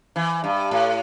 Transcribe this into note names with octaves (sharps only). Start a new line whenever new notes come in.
E3
G2
A2